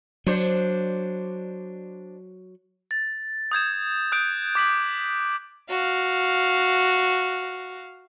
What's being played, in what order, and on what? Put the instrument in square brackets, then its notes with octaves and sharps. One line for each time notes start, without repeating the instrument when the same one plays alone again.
[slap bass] F#3 [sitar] D4 C5
[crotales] A6
D#6 G6 G#6 E7
D#6 F#6 G6 D7
D6 B6 F#7
[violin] F#4 F5